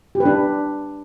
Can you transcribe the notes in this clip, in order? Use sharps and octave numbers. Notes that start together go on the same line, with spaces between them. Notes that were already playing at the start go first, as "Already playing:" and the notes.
G4
B4
D4